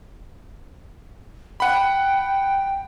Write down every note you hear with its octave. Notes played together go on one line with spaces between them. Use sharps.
F#5 G5 B5